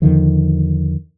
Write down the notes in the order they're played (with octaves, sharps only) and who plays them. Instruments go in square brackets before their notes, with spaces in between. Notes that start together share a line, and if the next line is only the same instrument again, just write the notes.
[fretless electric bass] E2 D3 D#3 F3